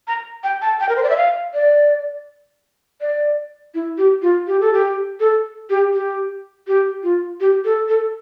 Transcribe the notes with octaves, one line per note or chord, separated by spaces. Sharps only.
A#5
G5
A5
G5
A#4
C5
D5
E5
F5
D5
D5
E4
G4
F4
G4
A4
G4
A4
G4
G4
G4
F4
G4
A4
A4